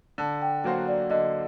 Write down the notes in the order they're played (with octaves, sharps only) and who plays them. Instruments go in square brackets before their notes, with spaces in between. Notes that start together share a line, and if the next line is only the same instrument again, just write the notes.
[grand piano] D3 [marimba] A5
[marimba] G5
[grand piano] F#3 A#3 F#4 C5 [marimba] F#5
[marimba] D5
[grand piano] D3 [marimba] D#5